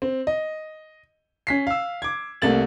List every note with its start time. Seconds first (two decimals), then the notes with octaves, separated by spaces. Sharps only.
0.02 C4
0.27 D#5
1.47 C#4 B6 C7
1.67 F5 E6
2.02 D6 G#6
2.42 C2 A3 A#3 A6 F#7